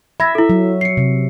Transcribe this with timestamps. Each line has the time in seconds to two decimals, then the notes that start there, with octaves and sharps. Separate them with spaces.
0.20 E5 B5 G#6 A#6
0.35 E4 A4
0.49 F#3
0.81 C7 C#7
0.97 C3